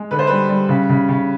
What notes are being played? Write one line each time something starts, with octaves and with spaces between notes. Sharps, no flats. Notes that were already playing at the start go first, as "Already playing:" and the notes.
Already playing: G#3
D3 B4
C5
G3 B4
G3
C#3
C#3
C#3